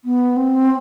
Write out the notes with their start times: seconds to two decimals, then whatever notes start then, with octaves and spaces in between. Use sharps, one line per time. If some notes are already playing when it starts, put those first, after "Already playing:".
0.05 B3
0.36 C4